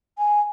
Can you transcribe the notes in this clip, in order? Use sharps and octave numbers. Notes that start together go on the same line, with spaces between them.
G#5